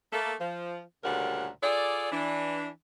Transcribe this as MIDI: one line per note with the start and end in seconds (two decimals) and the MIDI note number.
0.13 0.33 57
0.13 0.33 58
0.13 0.33 69
0.40 0.80 53
1.04 1.48 38
1.04 1.48 46
1.04 1.48 49
1.04 1.48 55
1.04 1.48 70
1.04 1.48 78
1.63 2.11 65
1.63 2.11 68
1.63 2.11 69
1.63 2.11 74
2.12 2.68 52
2.12 2.68 62